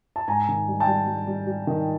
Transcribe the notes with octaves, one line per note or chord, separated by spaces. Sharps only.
A5
G#2 G#5 A#5
D#3
G3
G5 A5
G3
G3
G3
G3
D#3